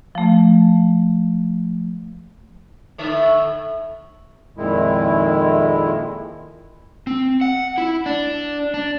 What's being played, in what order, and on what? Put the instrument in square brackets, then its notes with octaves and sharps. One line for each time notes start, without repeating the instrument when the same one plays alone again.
[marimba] F3 A3
[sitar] A2 D3 E5
[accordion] F2 A#2 D#3 G#3 E4
[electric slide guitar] C4
F#5
E4
D4
D4